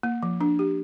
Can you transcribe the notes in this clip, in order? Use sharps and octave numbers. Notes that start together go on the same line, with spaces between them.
A#3
F3
D4
G4